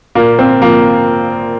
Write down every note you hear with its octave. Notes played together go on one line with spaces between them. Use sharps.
A#2 A#3
C4
F3 A#3